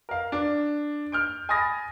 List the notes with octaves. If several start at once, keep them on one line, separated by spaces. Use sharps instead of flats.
A#4 F5
D4
F6 G6 D7
G#5 B5 D#6 A6 A#6